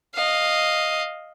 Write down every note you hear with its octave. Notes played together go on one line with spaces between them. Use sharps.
D#5 F5